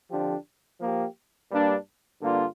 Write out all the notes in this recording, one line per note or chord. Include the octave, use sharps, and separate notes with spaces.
F2 D3 F3 D4 G4
F3 A#3 G4
G2 G3 A#3 D4
G2 D3 A#3 F4